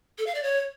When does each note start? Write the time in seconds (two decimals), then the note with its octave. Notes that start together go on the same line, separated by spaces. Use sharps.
0.18 A4
0.26 F5
0.35 D5
0.43 C#5